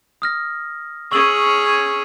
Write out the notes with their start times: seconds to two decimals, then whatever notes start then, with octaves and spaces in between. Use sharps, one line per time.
0.22 D#6 F6 A#6
1.12 C#4 G#4 C#6 E6 F#7